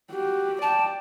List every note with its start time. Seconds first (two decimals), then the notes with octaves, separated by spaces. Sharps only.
0.12 F#4 G4
0.62 D5 G5 A5